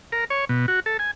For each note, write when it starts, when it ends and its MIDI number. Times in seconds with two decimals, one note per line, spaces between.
0.12 0.25 70
0.30 0.45 73
0.49 0.66 47
0.68 0.80 66
0.86 0.97 69
0.99 1.11 80